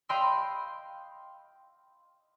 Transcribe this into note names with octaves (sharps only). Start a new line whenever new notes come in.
D#5 F5 G5 B5 C6 E6